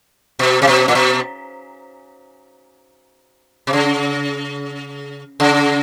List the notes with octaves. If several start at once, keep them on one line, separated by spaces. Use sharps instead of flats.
B2
C3
B2
A#2
B2
C3
C#3
C#3